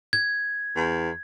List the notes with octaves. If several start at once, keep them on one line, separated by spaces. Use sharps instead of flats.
G#6
E2